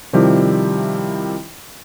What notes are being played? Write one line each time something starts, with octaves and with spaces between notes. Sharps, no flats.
C3 D#3 F3 G3 E4 G4